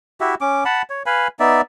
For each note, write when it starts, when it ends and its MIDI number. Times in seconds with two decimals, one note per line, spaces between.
0.21 0.35 64
0.21 0.35 66
0.21 0.35 67
0.21 0.35 76
0.41 0.64 61
0.41 0.64 86
0.65 0.82 78
0.65 0.82 81
0.65 0.82 83
0.90 1.03 73
1.06 1.28 71
1.06 1.28 77
1.06 1.28 80
1.06 1.28 83
1.40 1.61 59
1.40 1.61 63
1.40 1.61 74
1.40 1.61 76